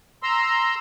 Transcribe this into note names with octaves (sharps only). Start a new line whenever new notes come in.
A#5 C6 E6